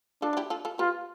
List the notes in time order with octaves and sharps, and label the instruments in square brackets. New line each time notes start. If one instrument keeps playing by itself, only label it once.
[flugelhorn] D4 [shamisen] F4 A4
[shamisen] F4
E4 G4
F4 A4
F4 A4
[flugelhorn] F4 [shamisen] G4 B4